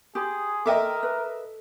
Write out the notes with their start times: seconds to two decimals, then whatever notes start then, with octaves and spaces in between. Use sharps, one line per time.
0.15 G4 G#4 C6 D#6
0.66 A4 A#4 D#5 E5 G5 D6
1.03 A4 B4